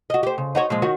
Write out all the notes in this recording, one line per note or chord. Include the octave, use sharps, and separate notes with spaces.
F#4 D#5
G4 C5
C#3
D#4 F#4 C#5
A#2 F3 G#3
D#3 F#4 C#5